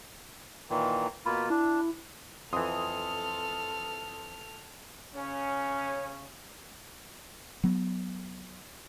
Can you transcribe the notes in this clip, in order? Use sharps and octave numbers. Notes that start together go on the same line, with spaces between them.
A#2 D#3 E3
B2 A#3 F4 B5
D4 E4
F2 E3 A4 C6 D#6 F6
C#3 C#4
F#3 B3